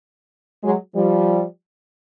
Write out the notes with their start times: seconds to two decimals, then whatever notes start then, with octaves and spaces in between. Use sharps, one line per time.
0.64 F#3 G#3
0.96 F3 G3